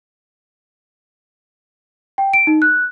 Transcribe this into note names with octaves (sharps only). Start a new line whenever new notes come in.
G5
D7
D#4
F#6